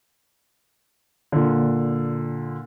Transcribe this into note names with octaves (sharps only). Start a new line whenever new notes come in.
A#2 D3